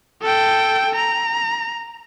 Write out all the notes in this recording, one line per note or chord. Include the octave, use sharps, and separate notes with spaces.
A4 G5
A#5